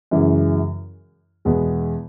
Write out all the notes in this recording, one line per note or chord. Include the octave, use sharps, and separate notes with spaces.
F#2 C#3 E3 G#3
E2 B2 G#3 B3